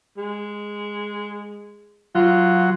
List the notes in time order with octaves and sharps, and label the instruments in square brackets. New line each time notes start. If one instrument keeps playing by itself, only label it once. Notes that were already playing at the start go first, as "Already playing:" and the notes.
[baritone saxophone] G#3
[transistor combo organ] F#3 [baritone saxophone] F4